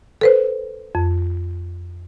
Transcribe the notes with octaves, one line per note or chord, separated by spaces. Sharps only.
A4 B4 C5
F2